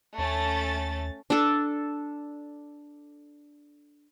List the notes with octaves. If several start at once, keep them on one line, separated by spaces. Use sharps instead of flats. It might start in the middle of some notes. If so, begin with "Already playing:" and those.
D#2 A3 C#4 A6
D4 A4